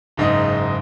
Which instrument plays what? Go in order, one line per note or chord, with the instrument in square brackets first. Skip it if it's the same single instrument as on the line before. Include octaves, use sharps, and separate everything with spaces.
[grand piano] F#1 G#2 D#4 D#5